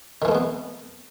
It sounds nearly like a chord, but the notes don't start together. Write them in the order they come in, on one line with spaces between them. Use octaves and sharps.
D#3 E3 A3 G#3 B3